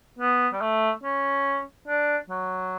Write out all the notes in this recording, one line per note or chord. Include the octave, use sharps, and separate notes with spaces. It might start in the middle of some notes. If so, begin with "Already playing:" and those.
B3
G3
A3
C#4
D4
F#3